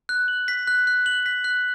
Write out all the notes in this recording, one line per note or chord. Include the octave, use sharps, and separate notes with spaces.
F#6
F#7
B6
F#6
F#6
F#7
B6
F#6